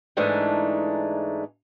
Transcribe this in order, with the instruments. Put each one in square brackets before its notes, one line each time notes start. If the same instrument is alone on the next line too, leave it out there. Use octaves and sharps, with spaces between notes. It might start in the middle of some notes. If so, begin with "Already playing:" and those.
[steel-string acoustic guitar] G#2 E3 G#3 A3 D4 D#4